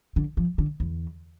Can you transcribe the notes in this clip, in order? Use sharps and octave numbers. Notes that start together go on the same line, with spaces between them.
D3
F3
D3
E2